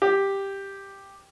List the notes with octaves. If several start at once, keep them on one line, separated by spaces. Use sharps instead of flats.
G4